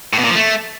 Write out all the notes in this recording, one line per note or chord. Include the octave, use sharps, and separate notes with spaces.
A2
B2
A#2
F3
A3